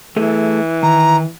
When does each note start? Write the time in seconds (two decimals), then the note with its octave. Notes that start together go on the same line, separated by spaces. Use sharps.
0.16 E3 A3 G#4 A4
0.83 D#3 A#5